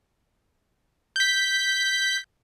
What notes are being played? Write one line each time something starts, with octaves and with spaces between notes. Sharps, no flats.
G6 B6